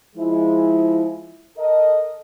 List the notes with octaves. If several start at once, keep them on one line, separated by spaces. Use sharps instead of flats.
F3 G#3 E4
A4 A#4 D#5